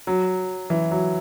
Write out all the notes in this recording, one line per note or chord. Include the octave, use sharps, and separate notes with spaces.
F#3
E3
F#3